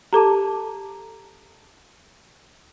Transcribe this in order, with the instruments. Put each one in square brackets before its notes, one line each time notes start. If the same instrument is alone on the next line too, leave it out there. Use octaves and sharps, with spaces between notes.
[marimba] G4 A4 D6 [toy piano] A5 A#5